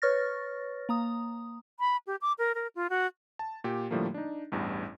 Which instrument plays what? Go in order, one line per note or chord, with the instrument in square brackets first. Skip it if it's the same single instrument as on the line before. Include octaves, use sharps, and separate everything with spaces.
[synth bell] B4 C#5 C#6 F6 A6 A#6
A#3 A#5 D#6
[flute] B5
G4
D6
A#4
A#4
F4
F#4
[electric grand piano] A5
A#2 G4
A2 D3 F3 G3 A3 A#3
D4 D#4
A1 E2 G2